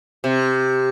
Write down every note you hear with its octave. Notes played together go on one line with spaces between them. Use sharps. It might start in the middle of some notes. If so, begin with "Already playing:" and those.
C3